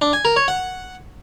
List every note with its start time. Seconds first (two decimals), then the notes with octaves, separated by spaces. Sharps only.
0.02 D4
0.13 G#5
0.25 A#4
0.36 C#5
0.48 F#5